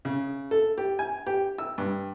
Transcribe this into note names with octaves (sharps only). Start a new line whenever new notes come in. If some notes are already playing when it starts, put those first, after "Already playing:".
C#3
A4
G4
G#5
G4
E6
G2